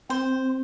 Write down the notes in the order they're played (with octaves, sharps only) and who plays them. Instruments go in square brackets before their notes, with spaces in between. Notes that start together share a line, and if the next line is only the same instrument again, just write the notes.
[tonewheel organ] C4 [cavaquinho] C5